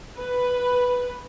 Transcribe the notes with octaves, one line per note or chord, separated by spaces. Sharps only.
B4